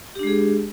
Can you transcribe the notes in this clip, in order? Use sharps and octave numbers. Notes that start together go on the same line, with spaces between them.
G#3 D4 G4 G#4